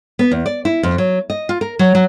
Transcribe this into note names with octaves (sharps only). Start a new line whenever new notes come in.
B3
E2
D5
E4
F2
F#3
D#5
F4
A#4
F#3
F#3